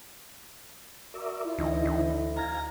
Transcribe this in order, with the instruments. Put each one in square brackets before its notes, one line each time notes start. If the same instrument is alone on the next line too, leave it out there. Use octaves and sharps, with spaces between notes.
[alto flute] F#4 [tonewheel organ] A#4 D5 E5
[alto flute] E4 [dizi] F4
[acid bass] D2 [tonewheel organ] D3 E3 D#4 [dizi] D#5
[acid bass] D2
[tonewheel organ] F5 G#5 [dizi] A#5